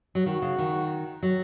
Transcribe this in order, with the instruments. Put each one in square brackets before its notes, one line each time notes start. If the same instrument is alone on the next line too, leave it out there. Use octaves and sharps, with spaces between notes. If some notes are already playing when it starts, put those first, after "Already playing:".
[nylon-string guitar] F#3
[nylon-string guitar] D#3 [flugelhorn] F#4
[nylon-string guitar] C#3
D#3
F#3